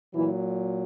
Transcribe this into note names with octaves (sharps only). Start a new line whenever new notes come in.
A#2 E3 F#3 E4